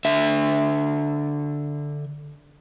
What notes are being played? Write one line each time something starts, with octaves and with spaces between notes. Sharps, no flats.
D3 E5